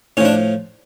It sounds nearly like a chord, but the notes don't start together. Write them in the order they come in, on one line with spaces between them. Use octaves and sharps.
A2 C#4 F3 D4